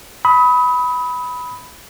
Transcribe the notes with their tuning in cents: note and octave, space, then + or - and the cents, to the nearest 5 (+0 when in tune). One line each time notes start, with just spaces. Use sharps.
B5 +0 D#6 +35